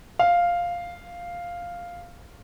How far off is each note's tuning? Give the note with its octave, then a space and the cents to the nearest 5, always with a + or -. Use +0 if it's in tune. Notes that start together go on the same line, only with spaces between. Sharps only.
F5 +0